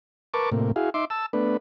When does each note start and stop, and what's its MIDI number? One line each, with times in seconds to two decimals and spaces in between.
0.34 0.50 70
0.34 0.50 71
0.34 0.50 81
0.34 0.50 85
0.34 0.50 86
0.52 0.72 45
0.52 0.72 48
0.52 0.72 58
0.76 0.90 64
0.76 0.90 66
0.76 0.90 68
0.76 0.90 77
0.94 1.05 63
0.94 1.05 76
0.94 1.05 84
0.94 1.05 86
1.10 1.26 81
1.10 1.26 88
1.33 1.57 57
1.33 1.57 59
1.33 1.57 62
1.33 1.57 71